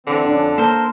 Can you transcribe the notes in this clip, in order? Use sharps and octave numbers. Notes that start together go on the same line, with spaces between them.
D3 E3 C4
F2 C#4 D4
A#3 A4 A#4 C5